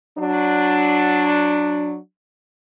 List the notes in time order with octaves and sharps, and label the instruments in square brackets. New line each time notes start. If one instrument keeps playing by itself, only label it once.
[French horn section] F#3 D4